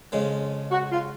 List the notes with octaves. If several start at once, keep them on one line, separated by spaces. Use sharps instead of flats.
F2 C#3 G#3
F#4
F4